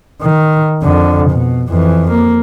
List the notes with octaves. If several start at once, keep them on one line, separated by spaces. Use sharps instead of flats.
D#3
F2 D3
B2
F2 E3
A#3